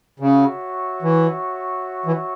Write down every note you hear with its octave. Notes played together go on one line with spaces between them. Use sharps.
C#3 F#4 C#5 E5
E3
E3